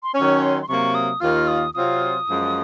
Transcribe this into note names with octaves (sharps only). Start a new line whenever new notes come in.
C6
D#3 F#3 C#4 C#6
C6
C6
C3 F#3 A#3 C#6
D#6
D#2 D#3 A#3 F4 F6
D#6
C3 F#3 C4 F4 D#6
F#2 F3 G#3